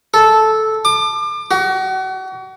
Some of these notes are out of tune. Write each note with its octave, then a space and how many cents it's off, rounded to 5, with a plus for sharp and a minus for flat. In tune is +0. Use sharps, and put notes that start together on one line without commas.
A4 -10
D6 +30
F#4 +35